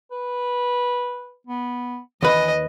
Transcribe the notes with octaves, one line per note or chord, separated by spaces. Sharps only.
B4
B3
D#2 E3 B4 D#5